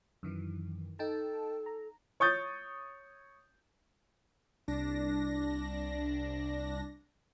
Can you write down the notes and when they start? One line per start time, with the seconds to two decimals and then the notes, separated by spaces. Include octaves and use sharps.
0.23 F#2 D#3 E3
0.99 D#4 A4 G5 A5
1.66 A#5
2.20 C#5 C#6 D#6 G6 A6
4.68 C2 D4 A#6